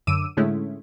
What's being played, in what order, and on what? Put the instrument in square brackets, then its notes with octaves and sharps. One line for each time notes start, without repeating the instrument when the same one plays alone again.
[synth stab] F#2 D3 D6 E6 D#7
A2 D3 G#3 A3 C#4 E4